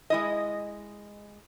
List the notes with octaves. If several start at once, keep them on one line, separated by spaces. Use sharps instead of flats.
G#3 E4 D#5